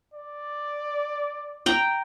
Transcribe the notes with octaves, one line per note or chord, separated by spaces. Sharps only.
D5
G5 A#5